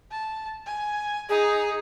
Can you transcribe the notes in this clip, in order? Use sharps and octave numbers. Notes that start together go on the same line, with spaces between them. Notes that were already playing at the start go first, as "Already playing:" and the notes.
A5
G#5
D#4 G#4